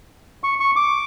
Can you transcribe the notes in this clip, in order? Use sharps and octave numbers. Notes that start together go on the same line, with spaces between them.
C#6
C#6
D6